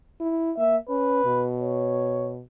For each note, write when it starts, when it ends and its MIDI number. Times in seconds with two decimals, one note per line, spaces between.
0.20 0.53 64
0.57 0.78 58
0.57 0.77 76
0.89 1.23 61
0.89 1.47 71
1.25 2.42 47
1.59 2.33 73